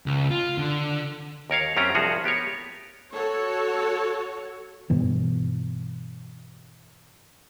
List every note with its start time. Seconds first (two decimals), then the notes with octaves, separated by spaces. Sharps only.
0.06 C#2
0.31 F4
0.58 D3
1.50 D#2 A#4 C#5 F5
1.77 F#2 C4 C#4 G4 A#5
1.95 C2 G2 F3 F#4 G#4 F#5
2.24 B3 G4 A#4 C#5
3.12 F#4 A4 C#5
4.90 G2 B2 E3 B3